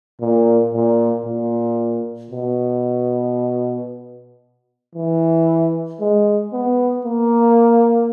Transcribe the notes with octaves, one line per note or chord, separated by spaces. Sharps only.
A#2
A#2
A#2
B2
E3
G#3
B3
A#3